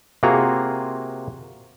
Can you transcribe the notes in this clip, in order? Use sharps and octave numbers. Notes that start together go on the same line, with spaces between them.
C3 A#3 F4 F#4 G#4 A#5